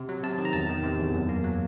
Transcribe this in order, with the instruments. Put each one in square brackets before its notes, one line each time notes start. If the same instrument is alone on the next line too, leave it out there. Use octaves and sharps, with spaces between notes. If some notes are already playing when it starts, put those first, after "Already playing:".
Already playing: [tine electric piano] C3
F#3
C3 A5
D#3
A#5
E2 A5
D#3
C3
E2
F#2
A#3
F#3